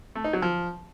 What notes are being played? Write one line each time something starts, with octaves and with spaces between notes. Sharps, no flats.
A3
D#4
F#3
F3